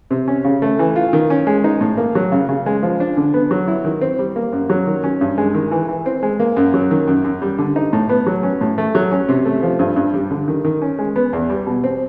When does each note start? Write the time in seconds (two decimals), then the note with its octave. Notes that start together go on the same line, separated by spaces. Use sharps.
0.11 C3
0.28 C#4
0.45 C#3
0.62 A3
0.79 E3
0.96 F4
1.13 D#3
1.30 C#4
1.47 G#3
1.64 D#4
1.81 A2
1.97 A#3
2.15 F#3
2.32 C#3
2.49 C#3
2.66 G#3
2.83 F3
3.00 D4
3.17 D3
3.34 B3
3.51 F#3
3.68 E4
3.85 D#3
4.01 C4
4.19 G3
4.36 A#3
4.53 F#2
4.70 F#3
4.87 D#3
5.04 C#4
5.21 G2
5.38 G#3
5.54 D#3
5.72 E3
5.88 E3
6.06 C4
6.23 G#3
6.40 A#3
6.57 F#2
6.74 F#3
6.91 D#3
7.08 F#2
7.24 F#2
7.42 G3
7.58 D3
7.76 D#4
7.93 A2
8.09 B3
8.27 F#3
8.43 C#4
8.61 A2
8.78 A3
8.95 F#3
9.12 C#4
9.29 C3
9.45 A3
9.63 F3
9.79 G2
9.96 G2
10.14 G3
10.31 D3
10.48 D#3
10.64 D#3
10.82 C#4
10.99 G#3
11.16 B3
11.33 E2
11.49 G3
11.67 B2
11.84 C4